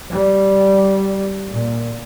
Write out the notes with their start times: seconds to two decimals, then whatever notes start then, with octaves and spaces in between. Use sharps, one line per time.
0.11 G3
1.50 A#2